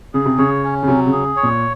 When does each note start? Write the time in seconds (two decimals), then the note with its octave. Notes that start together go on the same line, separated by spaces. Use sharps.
0.14 C#3 G#4
0.26 C3
0.38 C#3 C#5
0.64 C#4
0.83 C#3
0.88 C3 F#3
1.07 C#3
1.12 G#4
1.37 C#5
1.43 A#2